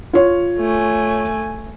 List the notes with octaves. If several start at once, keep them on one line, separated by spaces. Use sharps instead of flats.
F4 C#5
A3 G#5